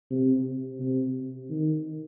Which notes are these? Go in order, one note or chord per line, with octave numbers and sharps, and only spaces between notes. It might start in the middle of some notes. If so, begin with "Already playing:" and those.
C3
C3
D#3